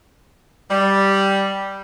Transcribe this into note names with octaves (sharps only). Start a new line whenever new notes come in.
G3